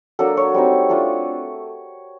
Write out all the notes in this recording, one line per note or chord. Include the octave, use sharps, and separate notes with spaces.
F#3 A#3 D4 A4
C#5
G3 C4 D#4
A3 D4 F4